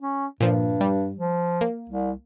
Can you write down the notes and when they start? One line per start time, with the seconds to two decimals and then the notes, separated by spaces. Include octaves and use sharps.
0.01 C#4
0.40 G2 A#2 F3
0.81 G3
1.18 F3
1.61 A#3
1.90 C2